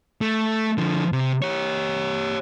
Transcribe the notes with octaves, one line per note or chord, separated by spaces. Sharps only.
A3
D3 F3
C3
G4 C#5